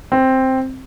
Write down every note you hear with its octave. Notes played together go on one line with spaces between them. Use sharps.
C4